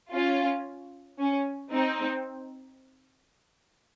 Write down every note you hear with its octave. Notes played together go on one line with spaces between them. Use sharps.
C#4 F4
C#4
C4 D#4